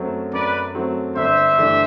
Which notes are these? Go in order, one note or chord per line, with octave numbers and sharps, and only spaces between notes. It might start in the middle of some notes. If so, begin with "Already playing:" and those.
Already playing: F#2 F#3 A3 C4
F#2 B4 D5
F#3 A3 C4
G1 C5 E5
G2 E3 A3 D4